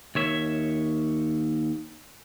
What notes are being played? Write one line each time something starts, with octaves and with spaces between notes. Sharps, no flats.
D#2 C#5 E5